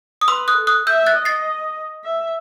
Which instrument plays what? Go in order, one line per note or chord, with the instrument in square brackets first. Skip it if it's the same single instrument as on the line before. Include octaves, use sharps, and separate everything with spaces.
[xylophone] D#6
[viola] B4 [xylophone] C6 E6
[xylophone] D#6 F#6
[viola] A4
[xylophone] D#6 F#6
[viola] E5 [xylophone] E6 G6
[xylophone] F#6 A6
[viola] D#5
[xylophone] A6 C7
[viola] E5